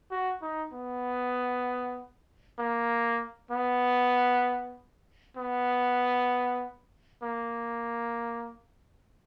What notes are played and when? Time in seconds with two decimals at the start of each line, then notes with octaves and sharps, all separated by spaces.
0.11 F#4
0.42 D#4
0.73 B3
2.59 A#3
3.51 B3
5.37 B3
7.23 A#3